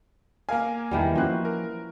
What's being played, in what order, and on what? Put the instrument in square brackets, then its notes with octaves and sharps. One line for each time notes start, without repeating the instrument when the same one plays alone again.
[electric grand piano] A#3 A#4 G#5 [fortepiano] F5
[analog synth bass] E2 [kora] D#3 E3 G3
[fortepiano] A#2 F#4 F#6 [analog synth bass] F3 [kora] C#4 C5
[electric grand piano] A#4